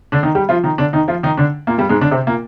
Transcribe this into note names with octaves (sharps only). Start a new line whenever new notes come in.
D3 D4
D#3 D#4
G3 G4
F3 F4
D#3 D#4
D3 D4
D#3 D#4
F3 F4
D#3 D#4
D3 D4
A#2 A#3
G2 G3
G#2 G#3
D3 D4
C3 C4
A#2 A#3